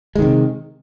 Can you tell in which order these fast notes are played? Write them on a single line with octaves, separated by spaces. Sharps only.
G#3 D#3 C3